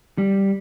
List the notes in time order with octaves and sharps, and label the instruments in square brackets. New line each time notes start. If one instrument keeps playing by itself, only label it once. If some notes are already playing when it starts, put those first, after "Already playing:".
[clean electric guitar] G3